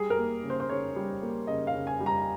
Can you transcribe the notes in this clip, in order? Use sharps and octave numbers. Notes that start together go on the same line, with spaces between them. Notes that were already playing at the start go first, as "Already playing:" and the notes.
Already playing: G3 G#4
A#4
A#3
C#3
C5
C5
C#3 C#5
G3
A#3
C#3 D#5
F5
C#3
G#5
G3
A#5